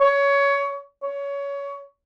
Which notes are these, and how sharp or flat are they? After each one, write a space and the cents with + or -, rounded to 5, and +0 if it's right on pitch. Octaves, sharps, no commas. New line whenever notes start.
C#5 +20
C#5 +20